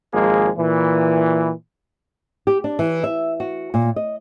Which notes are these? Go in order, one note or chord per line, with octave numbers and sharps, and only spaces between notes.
G#1 F3 G#3 A#3 G#4
A#2 E3
G4
D4
E3
E5
F#4
A#2
D#5